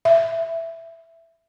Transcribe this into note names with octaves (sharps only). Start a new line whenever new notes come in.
E5